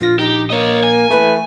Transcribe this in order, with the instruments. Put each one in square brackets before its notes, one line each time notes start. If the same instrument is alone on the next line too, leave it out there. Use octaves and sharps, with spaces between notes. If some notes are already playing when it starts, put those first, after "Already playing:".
[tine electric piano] A#1 A#6 [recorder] F4
[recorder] D#4 [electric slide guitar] G4
[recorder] A#3 [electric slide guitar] C#5 D#5
[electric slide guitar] G#5
[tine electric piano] E3 A3 [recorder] B4